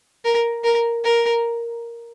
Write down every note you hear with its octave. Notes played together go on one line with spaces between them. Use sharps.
A#4
A#4
A#4